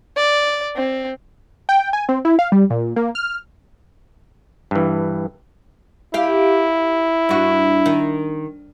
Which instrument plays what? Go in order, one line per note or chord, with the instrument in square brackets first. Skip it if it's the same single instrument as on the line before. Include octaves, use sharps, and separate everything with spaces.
[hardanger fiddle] D5
C4
[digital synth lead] G5
G#5
C4
E4
F5
G3
A#2
A#3
F6
[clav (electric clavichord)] G2 E3
[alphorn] E4 [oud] G4 F5
[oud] G2 F#4
D#3